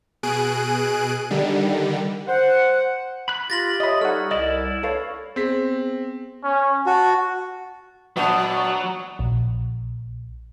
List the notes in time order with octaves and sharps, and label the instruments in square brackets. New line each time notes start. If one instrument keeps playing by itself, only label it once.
[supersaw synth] B2 G#4 F#6 D7 D#7
D3 D#3 G3
[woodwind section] C5 F#5
[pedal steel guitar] B5 F#6
[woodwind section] F4 [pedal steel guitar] G4 [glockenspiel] A6 A#6 F#7
[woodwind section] C#5 E5 D#6 [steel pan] D#5 B5
[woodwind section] G3 D#4 C#5 [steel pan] A4 F#5 [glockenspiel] F6
[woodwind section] C2 [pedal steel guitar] E4 D5 [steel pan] D#5
[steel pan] A4 B4 F5 [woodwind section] C#5
[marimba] B3 G#4 [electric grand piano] C4 B6
[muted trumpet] C#4
[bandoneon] F#4 [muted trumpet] A5
[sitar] A#2 B3 D4 [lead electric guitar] F#3
[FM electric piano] A#1